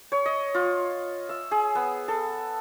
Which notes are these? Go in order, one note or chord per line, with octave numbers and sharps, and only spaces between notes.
C#5
D#5
F4
E5
G#4
B3
A4